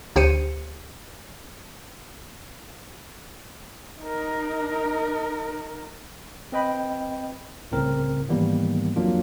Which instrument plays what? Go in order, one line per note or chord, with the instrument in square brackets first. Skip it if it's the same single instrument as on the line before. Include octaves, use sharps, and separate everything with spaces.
[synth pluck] D2 G4 C5 C#7 D#7
[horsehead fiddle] D#4 A#4
[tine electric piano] C4 B4 D#5 G5 B5
C2 A2 C#3 C4 A#4
G#2 D#3 E3 G3 A#3 B3
F2 F#3 A#3 D4 F4